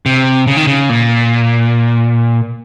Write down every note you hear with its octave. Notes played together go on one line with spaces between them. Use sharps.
C3
C#3
D#3
C#3
A#2